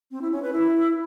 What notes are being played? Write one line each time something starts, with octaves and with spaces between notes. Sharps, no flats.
C4
E4
C#4
B4
E4